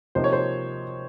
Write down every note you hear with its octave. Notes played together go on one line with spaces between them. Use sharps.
C3 F3 A#3 D#4 C5
C#5
C5